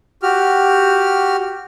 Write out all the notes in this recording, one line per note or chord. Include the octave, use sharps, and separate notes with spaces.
F#4 G4 F6